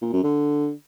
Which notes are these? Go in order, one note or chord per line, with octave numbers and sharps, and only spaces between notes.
A#2
F#2
D3